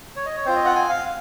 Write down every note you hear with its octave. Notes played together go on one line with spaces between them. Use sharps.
C#5
D#5
C#5
C4 F4 C5
D#5
F#5
G#5
F5